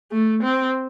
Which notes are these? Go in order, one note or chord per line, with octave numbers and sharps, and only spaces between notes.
A3
C4